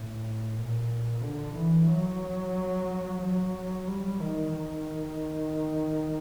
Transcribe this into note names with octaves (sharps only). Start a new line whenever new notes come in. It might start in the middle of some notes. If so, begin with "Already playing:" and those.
Already playing: A2
A#2
D3
E3
F#3
F#3
G3
D#3
D#3